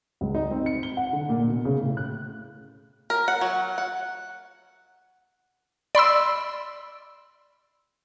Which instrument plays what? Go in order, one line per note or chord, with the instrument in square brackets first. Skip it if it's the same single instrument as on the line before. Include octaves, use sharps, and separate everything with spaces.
[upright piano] C#2
D#4
C4
C#7
G7
F#5
D3
A#2
B2
C#3
A2
F#6
[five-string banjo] A#4
F#5
F#3
F#5
[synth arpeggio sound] D5 B5 C6 E6